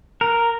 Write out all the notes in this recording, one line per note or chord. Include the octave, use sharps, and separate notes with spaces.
A#4